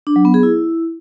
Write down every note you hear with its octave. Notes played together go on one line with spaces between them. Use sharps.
D4
F#3
B3
G#4
E4